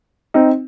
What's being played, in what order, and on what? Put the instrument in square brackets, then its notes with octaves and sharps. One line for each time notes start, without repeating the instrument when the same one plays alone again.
[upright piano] C4 D#4